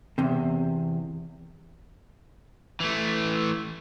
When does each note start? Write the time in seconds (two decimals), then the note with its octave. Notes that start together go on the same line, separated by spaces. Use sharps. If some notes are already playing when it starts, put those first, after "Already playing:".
0.18 E2 C3
2.80 E3 A3